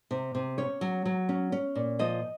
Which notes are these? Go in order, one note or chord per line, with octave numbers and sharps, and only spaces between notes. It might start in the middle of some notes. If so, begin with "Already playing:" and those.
C3
C3
C#4 C#5
F#3
F#3
C#4
C#4
A#2
F3 D#5